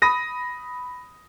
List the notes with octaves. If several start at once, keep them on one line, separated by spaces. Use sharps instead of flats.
B5 D#6 A#6 D#7